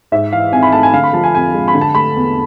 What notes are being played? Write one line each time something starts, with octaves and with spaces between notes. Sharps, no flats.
G#2 E5
E3 F5
G#1 G#5
B5
A3 A5
G#5
D3 F5
B5
F3 A5
G#5
F2 G#5
G#3
B5
D3
A5
A3 B5
E2